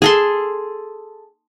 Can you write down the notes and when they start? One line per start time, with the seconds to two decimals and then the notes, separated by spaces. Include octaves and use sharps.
0.02 G#4 A4 C6